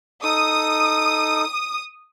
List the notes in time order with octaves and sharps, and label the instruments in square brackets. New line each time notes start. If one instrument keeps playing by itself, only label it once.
[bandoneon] D#4 A4 [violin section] D#6